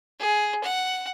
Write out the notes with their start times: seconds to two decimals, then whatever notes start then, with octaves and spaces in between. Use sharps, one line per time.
0.20 G#4
0.63 F#5